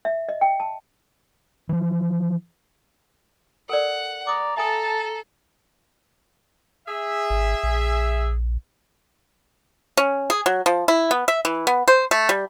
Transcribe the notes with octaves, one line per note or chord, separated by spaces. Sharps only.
E5
D#5
G5
A5
E3 F3
A4 A#4 D5 F#5
D5 A#5 D6 D#6
A4 E5 G#5 A5 D#6
G#4 E5
G#1
A#1
C#4
G#4
F#3
F3
E4
B3
E5
E3
B3
C5
A3
G3